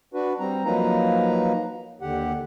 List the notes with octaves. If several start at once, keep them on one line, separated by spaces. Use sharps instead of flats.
D4 F#4 B4
G3 C4 A#5
F3 F#3 A#3 D#4 B4 A#5
D#2 D3 G4 F#5